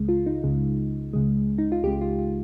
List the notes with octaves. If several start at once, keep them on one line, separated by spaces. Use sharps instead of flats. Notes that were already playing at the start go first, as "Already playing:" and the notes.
Already playing: C#2 C#3 G#3
F4
D#4
C#2 C#3 G#3
C#2 C#3 G#3
D#4
F4
C#2 C#3 G#3 G4
F4
F4